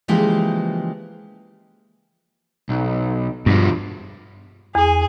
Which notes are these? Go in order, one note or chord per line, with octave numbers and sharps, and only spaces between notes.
C#3 E3 F3 G#3 A#3 G4
B1
G2 B2 F3
E2 G#4